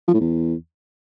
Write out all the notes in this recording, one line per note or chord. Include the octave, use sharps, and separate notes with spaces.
F3
A2
E2